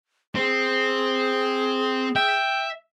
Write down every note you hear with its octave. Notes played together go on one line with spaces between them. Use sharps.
C4 G#4
E5 G5